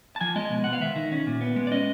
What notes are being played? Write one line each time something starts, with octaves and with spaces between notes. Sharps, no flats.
A5
F3 G#5
G#3 D#5
B2
B2 F#5
F5
D#3 E5
D#3
C#4
A#2
B3
G#3
D5
C#4 D#5